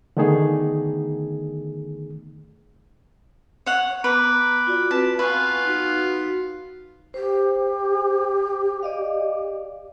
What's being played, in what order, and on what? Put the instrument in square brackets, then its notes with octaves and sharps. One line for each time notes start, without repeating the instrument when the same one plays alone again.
[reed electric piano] D3 D#3 A3 B3 D#4 G#4
[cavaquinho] C#5 F#5
[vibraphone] B3 A#5 [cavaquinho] B4 [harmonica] B5 D6
[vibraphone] F4 F#4 D5
[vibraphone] C4 B4 [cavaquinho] A5
[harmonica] B3 F4 F5 [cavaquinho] B4 [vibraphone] G#5 C#6
[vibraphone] D#4 F#4
[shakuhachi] G4 [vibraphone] C5
[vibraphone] D5 D#5 F5